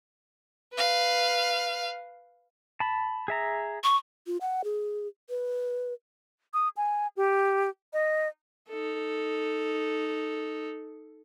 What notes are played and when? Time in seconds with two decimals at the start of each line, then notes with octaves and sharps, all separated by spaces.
0.73 B4 F5
2.80 A5 B5
3.28 G#4 E5 A#5
3.84 C#6
4.27 F4
4.41 F#5
4.64 G#4
5.29 B4
6.54 D#6
6.77 G#5
7.17 G4
7.93 D#5
8.69 D#4 A4